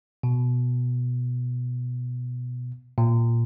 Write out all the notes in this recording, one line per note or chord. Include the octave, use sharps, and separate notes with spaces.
B2
A#2